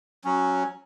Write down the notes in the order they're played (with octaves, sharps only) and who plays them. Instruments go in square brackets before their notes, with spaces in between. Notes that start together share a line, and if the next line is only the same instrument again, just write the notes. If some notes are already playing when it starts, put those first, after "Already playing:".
[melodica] F#3 C#4